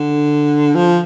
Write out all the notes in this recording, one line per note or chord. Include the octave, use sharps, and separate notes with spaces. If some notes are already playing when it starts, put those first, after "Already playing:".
Already playing: D3
F3